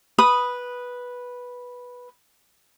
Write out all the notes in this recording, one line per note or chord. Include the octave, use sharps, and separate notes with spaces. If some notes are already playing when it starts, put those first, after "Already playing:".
B4 B5 D#6